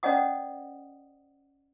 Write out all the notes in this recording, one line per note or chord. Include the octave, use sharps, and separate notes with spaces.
C#4 C5 D5 D#5 F#5 D#6